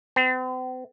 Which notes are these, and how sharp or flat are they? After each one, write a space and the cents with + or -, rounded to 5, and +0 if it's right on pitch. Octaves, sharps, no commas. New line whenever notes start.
C4 -40